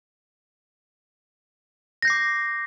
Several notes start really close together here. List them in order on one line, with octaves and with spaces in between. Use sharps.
A#6 G6 C7 D6